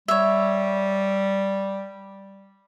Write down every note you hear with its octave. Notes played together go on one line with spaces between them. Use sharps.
G3 C#5 E5